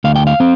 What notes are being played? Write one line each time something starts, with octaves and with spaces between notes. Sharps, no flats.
D2 F5
G5
F5
C4